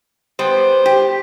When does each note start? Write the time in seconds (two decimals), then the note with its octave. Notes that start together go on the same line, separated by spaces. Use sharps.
0.39 G3 B3 C5
0.86 G4